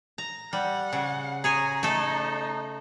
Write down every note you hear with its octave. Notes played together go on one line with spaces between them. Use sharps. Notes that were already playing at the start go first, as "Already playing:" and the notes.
A#5
G3 F#5
C#3
G#4 C#5 G#5 A#5
A3 D#4 A4